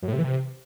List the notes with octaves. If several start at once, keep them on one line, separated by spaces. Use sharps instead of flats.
F#2
A2
C3
E3
C3